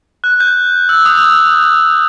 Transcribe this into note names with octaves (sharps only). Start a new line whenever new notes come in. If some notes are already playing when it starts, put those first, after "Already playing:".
F#6
G6
E6
D#6